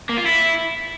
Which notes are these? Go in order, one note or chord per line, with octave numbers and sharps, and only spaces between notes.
A#3
F4
E4